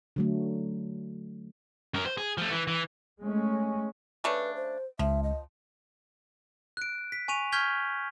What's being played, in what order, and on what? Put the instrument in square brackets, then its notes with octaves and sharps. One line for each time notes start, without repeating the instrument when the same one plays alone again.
[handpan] D3 F#3 A3
[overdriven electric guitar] F#2 A#4
C5
G#4
F3 A3
E3
E3
[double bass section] G#3 A3 C#4
[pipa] C#3 A3 D4 [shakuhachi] B4
[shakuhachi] C5
[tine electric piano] C#2 [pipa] F3 [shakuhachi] E5
[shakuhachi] D#5
[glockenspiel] F#6 D7
B6
G#5 C#6 D#7 F7
C#6 F6 G6 G#6 B6 G7